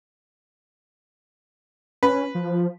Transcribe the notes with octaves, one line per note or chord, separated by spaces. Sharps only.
C#4 B4
F3